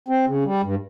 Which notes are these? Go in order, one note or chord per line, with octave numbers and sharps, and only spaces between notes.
C4
C#3
G3
G2